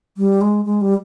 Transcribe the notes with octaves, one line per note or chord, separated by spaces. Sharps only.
G3
G#3
G#3
G3